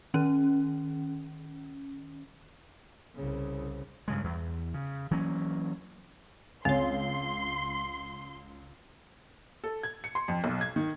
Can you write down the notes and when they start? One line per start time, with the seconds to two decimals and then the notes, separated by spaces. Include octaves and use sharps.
0.14 D#3 C#4
3.15 C2 C#3
4.08 G2 C#3 G#3
4.24 E2
4.74 C#3
5.11 E3 F#3 A#3 C#4
6.65 C#2 C4 C#5 C6
9.64 A4
9.83 G#6
10.04 C#7
10.15 C6
10.28 F2
10.44 B1
10.61 G#6
10.76 D#3